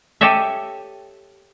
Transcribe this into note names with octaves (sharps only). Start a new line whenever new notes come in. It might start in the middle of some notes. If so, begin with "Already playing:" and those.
G4 A4 C#5 D#5 E5